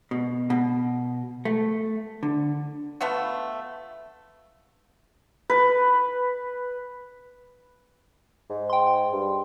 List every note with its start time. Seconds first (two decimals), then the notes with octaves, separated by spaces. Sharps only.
0.11 B2
0.50 B2
1.45 A3
2.23 D3
3.01 A3 B3 F4 F#4
5.50 B4
8.50 G#2
8.70 G5 C6
9.12 G2